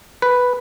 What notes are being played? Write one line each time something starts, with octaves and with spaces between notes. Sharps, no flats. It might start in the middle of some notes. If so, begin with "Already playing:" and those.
B4